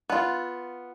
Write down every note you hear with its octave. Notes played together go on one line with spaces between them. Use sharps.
B3 F4